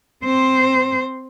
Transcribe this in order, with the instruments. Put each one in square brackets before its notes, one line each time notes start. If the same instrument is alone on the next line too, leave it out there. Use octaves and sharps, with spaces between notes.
[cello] C4 C5